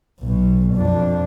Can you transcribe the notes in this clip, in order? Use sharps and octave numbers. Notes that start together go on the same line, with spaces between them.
B1 B2
F2 D4